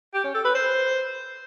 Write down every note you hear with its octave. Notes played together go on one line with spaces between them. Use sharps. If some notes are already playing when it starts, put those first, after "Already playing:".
G4
C#4
A4
B4
C5